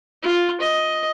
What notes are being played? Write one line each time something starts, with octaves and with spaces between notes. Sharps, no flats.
F4
D#5